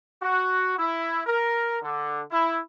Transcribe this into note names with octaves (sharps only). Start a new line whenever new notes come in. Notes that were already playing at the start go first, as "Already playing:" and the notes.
F#4
E4
A#4
D3
E4